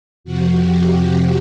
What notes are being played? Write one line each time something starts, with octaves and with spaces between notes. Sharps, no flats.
F2 C3 F3 F#4
G4
F#4